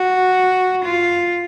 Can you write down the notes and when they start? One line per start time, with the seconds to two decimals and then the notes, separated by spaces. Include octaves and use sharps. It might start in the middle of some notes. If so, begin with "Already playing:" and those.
Already playing: F#4
0.84 F4